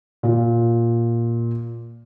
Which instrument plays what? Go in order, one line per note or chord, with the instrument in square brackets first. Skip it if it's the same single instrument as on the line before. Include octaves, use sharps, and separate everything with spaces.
[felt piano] A#2 F4